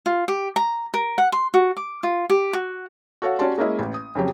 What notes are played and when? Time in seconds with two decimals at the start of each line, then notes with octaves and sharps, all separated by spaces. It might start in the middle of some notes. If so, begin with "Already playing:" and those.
0.06 F4
0.28 G4
0.56 A#5
0.94 A#4
1.18 F#5
1.32 C6
1.54 F#4
1.77 D6
2.03 F4
2.30 G4
2.53 F#4
3.22 F#4 A4 C#5 F5 F#5
3.39 C#4 F#4 G4 D5 A5 C6
3.58 G#3 A#3 C#4 E4 D#5
3.79 A1
3.94 D#6
4.15 F2 C#3 F#3 G4